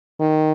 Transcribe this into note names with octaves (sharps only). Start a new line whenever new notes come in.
D#3